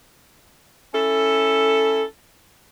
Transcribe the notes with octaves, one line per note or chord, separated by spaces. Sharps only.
C#4 E4 A4